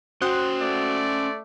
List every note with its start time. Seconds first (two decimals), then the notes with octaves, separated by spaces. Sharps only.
0.21 C#4 F#4 C5 F#5 G5 C6 D#6 F#6
0.61 A3 D5